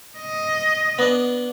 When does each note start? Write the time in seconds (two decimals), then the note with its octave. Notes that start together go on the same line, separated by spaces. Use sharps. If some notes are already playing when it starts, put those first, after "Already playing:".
0.19 D#5
0.99 B3 D4